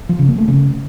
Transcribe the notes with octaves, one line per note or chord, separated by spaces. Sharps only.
F3
C#3
A#3
A3
C#3